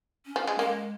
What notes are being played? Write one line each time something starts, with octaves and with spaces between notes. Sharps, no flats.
C#4
F3
G#3
G#3 A#3